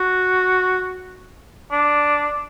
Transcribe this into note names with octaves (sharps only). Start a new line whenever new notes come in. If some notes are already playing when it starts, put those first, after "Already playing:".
Already playing: F#4
D4